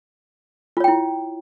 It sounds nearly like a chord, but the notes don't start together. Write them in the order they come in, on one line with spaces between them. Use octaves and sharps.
F4 C#5 G5 E4